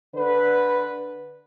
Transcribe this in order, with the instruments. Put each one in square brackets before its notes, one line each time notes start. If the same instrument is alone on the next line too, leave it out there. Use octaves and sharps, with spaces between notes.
[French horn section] D3 B4